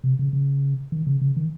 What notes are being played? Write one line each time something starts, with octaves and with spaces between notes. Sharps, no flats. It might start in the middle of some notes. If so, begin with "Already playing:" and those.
C3
C#3
C#3
D#3
C#3
C#3
D#3